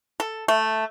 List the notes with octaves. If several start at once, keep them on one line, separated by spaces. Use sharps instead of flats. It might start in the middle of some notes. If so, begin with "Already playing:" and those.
A4
A3